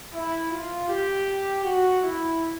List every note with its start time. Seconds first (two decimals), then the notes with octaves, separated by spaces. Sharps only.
0.13 E4
0.51 F4
0.89 G4
1.64 F#4
2.03 E4